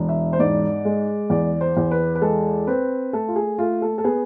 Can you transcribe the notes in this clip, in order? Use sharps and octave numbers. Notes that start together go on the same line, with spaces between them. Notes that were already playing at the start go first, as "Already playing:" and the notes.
Already playing: E1
E5
C5
G#2 D5
G#3
E2 D5
C5
E2
B4
B4
G#3 A4
C4 B4
A3 A4
F4
G#4
A3 F4
A4
A4
B3 G#4